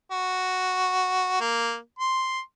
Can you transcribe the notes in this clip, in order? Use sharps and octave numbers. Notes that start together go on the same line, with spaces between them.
F#4
A#3
C6